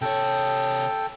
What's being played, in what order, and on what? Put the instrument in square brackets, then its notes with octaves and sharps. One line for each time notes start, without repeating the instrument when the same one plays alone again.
[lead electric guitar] C3 C#5 [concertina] A4 G5